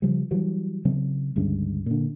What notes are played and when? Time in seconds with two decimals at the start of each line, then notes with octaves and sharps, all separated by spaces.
0.02 C#3 F3 G3
0.31 E3 F#3 G3
0.85 C#3 F#3 C4
1.36 G1 C#2 G2 C#3
1.86 A#2 D3